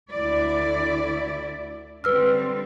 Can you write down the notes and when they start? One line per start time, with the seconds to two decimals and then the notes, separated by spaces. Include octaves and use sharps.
0.11 D2 E4 D5
2.04 D3 G3 C4 B4 E6 F6